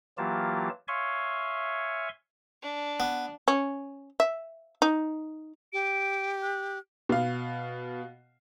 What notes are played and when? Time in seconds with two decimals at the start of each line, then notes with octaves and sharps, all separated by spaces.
0.18 E3 F#3 A#3 F4 G4 A5
0.88 C#5 E5 F5 G#5 C6 C#6
2.62 D4
3.00 B3
3.48 C#4
4.20 E5
4.82 D#4
5.73 G4 D7
6.42 F#6
7.09 B2 F5